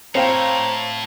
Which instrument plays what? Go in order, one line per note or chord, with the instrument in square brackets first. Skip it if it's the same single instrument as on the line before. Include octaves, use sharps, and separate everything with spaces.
[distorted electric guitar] A2 [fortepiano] C4 F5 G5 [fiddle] C5 C#5 [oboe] A#5